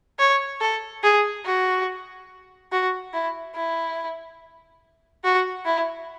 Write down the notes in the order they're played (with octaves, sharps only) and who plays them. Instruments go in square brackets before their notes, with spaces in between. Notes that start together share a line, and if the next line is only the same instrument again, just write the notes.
[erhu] C#5
A4
G#4
F#4
F#4
E4
E4
F#4
E4